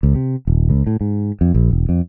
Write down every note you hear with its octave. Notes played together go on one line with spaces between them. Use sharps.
C#2
C3
D#1
C#2
A2
G#2
F2
A#1
E1
F2